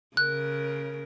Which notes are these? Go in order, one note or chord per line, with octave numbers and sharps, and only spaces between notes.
C#3 A#4 F#6